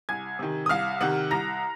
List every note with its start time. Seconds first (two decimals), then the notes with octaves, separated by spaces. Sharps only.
0.09 C2 G#5 G#6
0.39 C3 D#3
0.66 D#6
0.69 C2 F5 F6
1.01 C3 D#3 F#5 F#6
1.31 C2 A#5 A#6